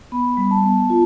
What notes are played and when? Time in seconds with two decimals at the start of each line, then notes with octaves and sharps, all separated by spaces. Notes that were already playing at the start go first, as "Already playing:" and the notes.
0.12 B3 B5
0.37 G3
0.51 A5
0.64 B3
0.90 F4